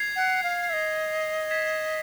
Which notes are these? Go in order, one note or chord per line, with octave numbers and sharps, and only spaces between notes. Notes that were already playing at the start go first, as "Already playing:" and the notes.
Already playing: G#6 C7 F7
F#5
F5
E5
D#5
G#6 B6 E7